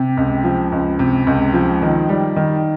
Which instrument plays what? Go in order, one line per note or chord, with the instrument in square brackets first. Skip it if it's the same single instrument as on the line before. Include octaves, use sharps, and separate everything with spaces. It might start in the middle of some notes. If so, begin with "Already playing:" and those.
Already playing: [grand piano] C3
C#2
F3
C#2
C3
C#2
F3
D#3
G3
D#3